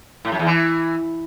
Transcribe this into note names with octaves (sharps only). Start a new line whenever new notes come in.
A2
F#2
E2
E3